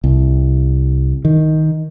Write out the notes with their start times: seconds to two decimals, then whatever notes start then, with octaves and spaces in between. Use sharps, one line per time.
0.04 C2
1.25 D#3